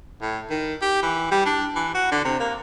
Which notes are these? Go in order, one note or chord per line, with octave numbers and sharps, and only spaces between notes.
A2
D#3
G4
E3
G3
D4
E3
F#4
D3
C3
A#3